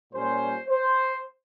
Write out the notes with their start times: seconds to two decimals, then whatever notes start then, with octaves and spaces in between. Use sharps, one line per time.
0.13 A#2 G3 C#4 C5
0.69 C5